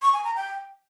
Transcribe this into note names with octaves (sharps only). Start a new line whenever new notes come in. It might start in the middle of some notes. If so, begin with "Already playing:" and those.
C#6
G#5
A#5
G5